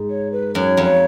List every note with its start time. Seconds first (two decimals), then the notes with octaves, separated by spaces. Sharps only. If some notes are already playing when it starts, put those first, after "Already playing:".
Already playing: G#2
0.10 C#5
0.32 B4
0.55 F#2 C#5
0.77 F2
0.84 C#5